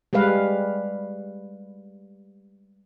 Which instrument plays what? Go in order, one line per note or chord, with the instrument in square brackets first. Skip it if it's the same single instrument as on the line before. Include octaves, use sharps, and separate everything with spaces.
[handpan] G3 G#3 B4 F5